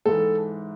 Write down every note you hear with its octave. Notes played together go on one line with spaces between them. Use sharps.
G#2 E3 A4